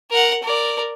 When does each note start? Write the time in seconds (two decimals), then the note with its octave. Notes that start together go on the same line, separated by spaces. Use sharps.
0.10 A#4 F#5
0.43 A#4 D5